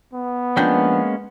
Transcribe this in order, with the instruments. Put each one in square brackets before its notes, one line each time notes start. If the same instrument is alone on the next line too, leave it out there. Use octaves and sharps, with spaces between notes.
[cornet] B3
[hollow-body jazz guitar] F3 D4 G5 [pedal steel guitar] G#3 A#3 C#4